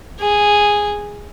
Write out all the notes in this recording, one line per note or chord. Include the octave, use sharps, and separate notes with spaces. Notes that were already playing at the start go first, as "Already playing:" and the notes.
G#4